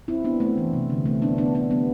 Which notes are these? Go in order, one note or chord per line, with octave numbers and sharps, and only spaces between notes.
C4 E4
B3 D4
A3 C4
E3
C3
D3
A3 C4
B3 D4
B3 D4
B3 D4
G3 B3